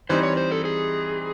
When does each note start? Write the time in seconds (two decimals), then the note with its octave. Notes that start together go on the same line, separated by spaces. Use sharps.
0.09 E3 G3 C4 D#4 C5
0.23 C#5
0.37 C5
0.52 A4
0.65 G#4